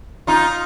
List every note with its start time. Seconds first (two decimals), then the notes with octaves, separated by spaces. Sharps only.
0.27 D#4 F4